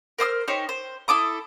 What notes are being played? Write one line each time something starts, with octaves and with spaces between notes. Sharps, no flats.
A#4 C5 D#6 F6
D#4 G4 C5 C#5
C5
E4 A4 D6 D#6